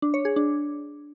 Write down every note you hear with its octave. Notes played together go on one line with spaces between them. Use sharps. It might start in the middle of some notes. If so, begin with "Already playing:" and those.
D4
C#5
G#4
D4